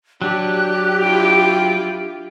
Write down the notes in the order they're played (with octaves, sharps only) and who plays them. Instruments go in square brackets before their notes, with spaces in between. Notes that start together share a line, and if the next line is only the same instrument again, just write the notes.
[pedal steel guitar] F#3 D4 [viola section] G4 [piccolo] F#6
[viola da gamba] E4 F4 [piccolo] G5